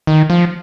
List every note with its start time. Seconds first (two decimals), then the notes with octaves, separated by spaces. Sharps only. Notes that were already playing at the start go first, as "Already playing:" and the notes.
0.07 D#3
0.30 F3